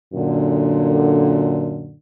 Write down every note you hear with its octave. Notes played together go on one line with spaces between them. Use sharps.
F#2 A#2 D3